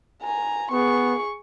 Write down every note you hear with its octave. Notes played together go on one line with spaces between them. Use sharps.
G#5 A#5
B3 G#4 C#6